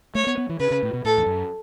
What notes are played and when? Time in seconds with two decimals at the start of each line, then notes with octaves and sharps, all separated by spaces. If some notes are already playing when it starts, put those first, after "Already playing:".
0.15 A3 C#5
0.27 B3
0.38 B3
0.49 E3
0.60 C#3 B4
0.71 C#3
0.83 A2
0.93 B2
1.05 A2 A4
1.17 E2
1.26 F#2